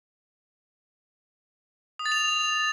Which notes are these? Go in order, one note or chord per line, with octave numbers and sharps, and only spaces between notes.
D#6
A6
F7